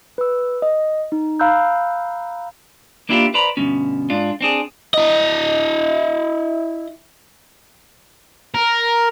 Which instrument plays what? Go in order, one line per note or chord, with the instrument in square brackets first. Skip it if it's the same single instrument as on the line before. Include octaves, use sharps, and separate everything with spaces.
[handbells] B4 E6
D#5
D#4
F5 A#5 B5 E6 F#6 G6
[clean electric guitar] A#3 D4 E4 F4 G4
B4 C5 D5 A#5 B5
D2 G2 B2 C#4
G#2 D4 F4
C4 D4 G#4
[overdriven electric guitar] E4 D#5
[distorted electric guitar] A#4